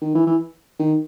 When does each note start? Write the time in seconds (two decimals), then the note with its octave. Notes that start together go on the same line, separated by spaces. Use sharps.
0.02 D#3
0.15 E3
0.27 E3
0.80 D#3